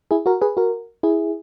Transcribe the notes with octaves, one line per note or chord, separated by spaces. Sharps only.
E4 G#4
F#4 A#4
G#4 B4
F#4 A#4
E4 G#4